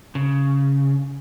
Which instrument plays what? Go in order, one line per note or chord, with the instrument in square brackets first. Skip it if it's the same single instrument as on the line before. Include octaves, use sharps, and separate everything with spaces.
[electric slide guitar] C#3